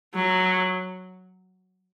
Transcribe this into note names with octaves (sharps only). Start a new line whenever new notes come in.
F#3